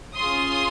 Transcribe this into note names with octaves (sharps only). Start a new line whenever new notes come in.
C#4 F4 G#4 C6 D#6